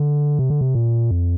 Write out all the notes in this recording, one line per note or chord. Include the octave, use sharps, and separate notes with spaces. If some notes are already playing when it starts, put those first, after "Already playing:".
Already playing: D3
C3
D3
C3
A#2
F2